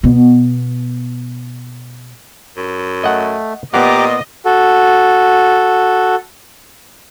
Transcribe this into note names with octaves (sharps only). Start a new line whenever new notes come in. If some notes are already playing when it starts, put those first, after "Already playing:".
B2 B3
F#2
A3 D#5 F#5
A#2 B3 G4 D#5 F#5 A#5 D6
F#4 A4